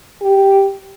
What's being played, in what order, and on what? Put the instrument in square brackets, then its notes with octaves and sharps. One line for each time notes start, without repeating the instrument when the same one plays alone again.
[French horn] G4